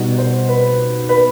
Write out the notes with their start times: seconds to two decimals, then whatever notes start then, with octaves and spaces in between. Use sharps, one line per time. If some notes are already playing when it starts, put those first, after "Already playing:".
Already playing: B2 G3 B3 D#4 F#4
0.18 C5
0.49 B4
1.09 B4